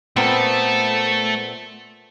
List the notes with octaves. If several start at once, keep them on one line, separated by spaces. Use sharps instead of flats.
A#2 A3 B3 C4 A4